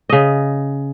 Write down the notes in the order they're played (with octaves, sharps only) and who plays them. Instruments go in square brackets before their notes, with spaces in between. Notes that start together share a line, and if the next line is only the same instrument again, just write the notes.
[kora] C#3 D#5